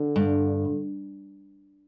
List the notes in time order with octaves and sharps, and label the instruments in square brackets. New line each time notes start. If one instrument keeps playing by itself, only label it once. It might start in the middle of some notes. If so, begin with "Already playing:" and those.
Already playing: [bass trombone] D3
[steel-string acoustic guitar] G2